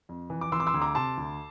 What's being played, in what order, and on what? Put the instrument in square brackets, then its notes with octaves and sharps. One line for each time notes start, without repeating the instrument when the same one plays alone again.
[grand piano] F2
E3
D6
E3 C6 E6
D6
C6 E6
D2
A#5 D6
C3 A5 C6
D2